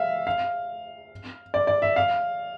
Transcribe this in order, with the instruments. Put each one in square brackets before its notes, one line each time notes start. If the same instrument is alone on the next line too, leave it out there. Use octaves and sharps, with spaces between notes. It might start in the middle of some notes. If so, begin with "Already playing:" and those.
Already playing: [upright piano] E5 F5
F5
D5
D5
E5
F5